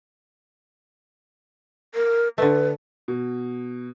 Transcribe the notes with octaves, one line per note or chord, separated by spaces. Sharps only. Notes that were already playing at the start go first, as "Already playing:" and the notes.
A#4
D3 A3 B4
B2